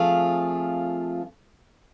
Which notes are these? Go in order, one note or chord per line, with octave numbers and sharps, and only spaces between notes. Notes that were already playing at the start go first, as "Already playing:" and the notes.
Already playing: F3 A3 C4 F4 G#4